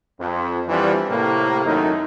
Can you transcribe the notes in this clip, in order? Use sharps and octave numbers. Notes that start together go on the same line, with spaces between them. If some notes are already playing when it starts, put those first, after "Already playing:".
F2
E3 F3 G3 B3 C4 D4
A2 C3 A#3
G#1 F#2 D#3 A3 D#4